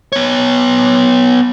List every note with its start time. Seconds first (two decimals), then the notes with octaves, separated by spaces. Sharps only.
0.12 B3 C#5